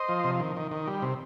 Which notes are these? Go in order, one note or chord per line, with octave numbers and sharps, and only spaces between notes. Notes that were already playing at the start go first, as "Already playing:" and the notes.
Already playing: C5 D#5
F3
C3
D#3
D#3
D#3
G3
C3